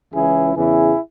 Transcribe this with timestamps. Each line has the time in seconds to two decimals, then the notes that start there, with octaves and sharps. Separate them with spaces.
0.14 C#2 C#3 E3 E4 G#4
0.55 E2 C#3 E3 E4 G#4